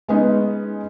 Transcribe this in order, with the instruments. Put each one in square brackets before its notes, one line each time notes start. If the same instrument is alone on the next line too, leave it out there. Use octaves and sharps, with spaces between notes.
[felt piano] G#3 B3 C#4 D#4